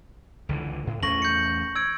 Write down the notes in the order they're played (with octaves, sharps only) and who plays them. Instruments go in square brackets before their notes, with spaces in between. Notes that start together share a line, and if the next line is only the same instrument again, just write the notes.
[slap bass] C#2 D3 E3
A2
[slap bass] E2 A3 C#4 [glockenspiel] C#6 A#6 F#7
[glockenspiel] G6 C#7
E6 G#6 D7